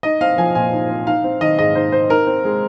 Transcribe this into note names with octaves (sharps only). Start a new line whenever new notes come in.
D#4 D#5
C4 F5
F3 G#5
A#2 G#5
D#4
C4
D#4 F5
C4
D#3 D#5
G#2 D#5
D#4 C5
C4 C5
D#4 A#4
C4
G#3